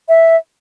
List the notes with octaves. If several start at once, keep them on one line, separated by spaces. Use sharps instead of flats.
E5